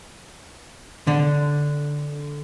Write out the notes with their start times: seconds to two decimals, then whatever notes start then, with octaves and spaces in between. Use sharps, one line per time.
1.07 D3